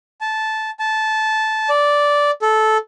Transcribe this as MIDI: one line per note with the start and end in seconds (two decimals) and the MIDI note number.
0.21 0.70 81
0.79 1.69 81
1.69 2.31 74
2.42 2.77 69